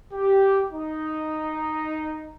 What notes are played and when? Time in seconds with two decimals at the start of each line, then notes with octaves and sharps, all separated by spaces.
0.13 G4
0.72 D#4